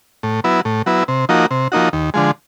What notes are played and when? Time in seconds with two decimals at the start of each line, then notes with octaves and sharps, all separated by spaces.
0.23 A2
0.44 F#3 B3 E4
0.65 A2
0.86 F#3 B3 E4
1.08 C3
1.29 F3 A#3 D#4 F#4
1.51 C3
1.72 F3 A#3 D#4 F#4
1.93 D#2
2.14 D3 F3 G#3